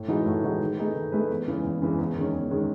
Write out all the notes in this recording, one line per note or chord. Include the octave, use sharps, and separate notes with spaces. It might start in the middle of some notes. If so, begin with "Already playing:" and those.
Already playing: A2
E3 G#3 D#4 F#4
A2
E3 G#3 D#4 F#4
D#3
A3 D#4 G#4 B4
D#3
A3 D#4 G#4 B4
E2
C#3 E3 G#3
E2
C#3 E3 G#3
E2
D#3 G#3 C#4
E2
D#3 G#3 C#4